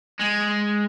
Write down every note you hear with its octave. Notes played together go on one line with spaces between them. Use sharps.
G#3